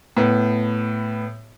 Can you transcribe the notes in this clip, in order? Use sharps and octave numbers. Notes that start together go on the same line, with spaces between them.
A2 B3